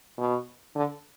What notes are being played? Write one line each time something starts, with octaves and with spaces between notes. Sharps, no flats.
B2
D3